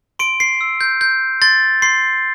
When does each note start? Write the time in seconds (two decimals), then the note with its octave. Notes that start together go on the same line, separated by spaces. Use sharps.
0.19 C6 D7
0.40 C7
0.61 E6
0.81 G6
1.01 G6
1.42 C6 A6
1.82 C6 C7